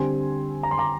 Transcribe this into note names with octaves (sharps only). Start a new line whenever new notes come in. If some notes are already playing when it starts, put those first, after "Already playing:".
Already playing: D3 G3 C4 G#5 C6
A#5
C6
A#5 D6